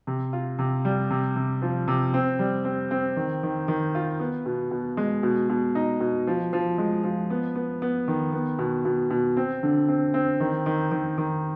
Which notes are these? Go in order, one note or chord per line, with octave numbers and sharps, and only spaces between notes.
C3
F4
C3
G3
C3
C3
F3
C3
C4
G3
C4
C4
D#3
D#3
D#3
F4
B3
B2
B2
G#3
B2
B2
D#4
B2
F3
F3
G#3
F3
B3
B3
B3
D#3
B3
B2
B2
B2
C4
D3
C4
C4
D#3
D#3
D#3
D#3